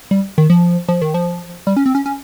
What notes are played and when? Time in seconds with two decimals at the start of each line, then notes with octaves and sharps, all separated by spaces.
0.11 G3
0.38 D#3
0.50 F3
0.88 F3
1.02 D#3
1.14 F3
1.67 G3
1.77 C#4
1.86 C4
1.95 C#4
2.06 C#4